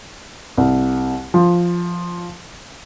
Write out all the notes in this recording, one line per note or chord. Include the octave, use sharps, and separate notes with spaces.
C2
F3